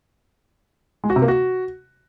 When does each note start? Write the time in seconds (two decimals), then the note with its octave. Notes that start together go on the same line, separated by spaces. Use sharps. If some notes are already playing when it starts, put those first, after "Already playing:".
1.04 G#3
1.10 F#4
1.16 C3
1.22 A#3
1.28 F#4